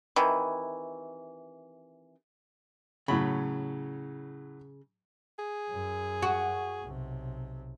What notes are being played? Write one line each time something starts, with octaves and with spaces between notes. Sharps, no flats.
C3 D#3 E3
A2 C#3 F#3 B5
G#4
F#2
F#4
B1 C3